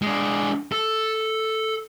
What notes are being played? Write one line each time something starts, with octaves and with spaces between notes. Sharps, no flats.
G#3 D4
A4